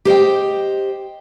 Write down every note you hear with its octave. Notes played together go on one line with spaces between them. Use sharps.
G4 C5 D#5 G5